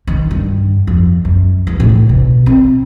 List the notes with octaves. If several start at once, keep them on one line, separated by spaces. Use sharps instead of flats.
D#3
G2
F2
F#2
E2
A2
B2
C4